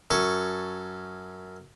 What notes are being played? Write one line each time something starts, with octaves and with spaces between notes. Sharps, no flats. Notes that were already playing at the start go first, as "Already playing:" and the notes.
F#2 A4 G#5 A5 C#6